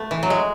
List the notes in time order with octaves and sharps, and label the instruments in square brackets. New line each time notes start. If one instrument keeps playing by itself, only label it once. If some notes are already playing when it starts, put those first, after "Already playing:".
Already playing: [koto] A3 B3
E3
F#3
G#3